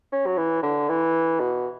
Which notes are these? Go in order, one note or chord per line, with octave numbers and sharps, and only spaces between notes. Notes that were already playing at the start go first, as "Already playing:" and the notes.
C#4
F#3
E3
D3
E3
B2